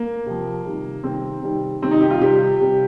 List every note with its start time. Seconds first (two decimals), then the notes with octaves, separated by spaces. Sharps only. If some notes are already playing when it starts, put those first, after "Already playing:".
Already playing: A#3
0.26 C3 F3
0.65 C3 D#3 G3
1.03 C3 D#3 G3 C4
1.43 C3 D#3 G3
1.82 C3 D#3 G3 C4
1.91 D#4
2.01 G4
2.10 F4
2.21 C3 G3 G4
2.60 C3 G3